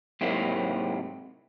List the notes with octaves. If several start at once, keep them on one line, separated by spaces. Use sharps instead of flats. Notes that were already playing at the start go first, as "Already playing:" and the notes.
G#2 C3 F#3 A#3 C4 E4